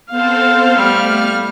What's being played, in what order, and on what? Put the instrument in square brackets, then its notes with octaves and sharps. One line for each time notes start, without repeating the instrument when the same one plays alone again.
[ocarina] B3 [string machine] C4 A4 C5 [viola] F5
[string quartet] A2 G3 F6 [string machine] A3